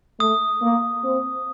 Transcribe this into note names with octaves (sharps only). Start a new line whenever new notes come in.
A3 D#6
A#3
C4